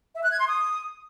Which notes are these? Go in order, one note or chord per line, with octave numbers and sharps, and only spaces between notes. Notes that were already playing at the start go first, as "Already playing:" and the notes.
E5
F#6
G#6
C6
D#6